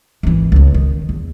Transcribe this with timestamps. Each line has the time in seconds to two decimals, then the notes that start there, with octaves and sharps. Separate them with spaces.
0.23 G#1 E3
0.52 C#2 B3
0.74 D#3
1.09 E2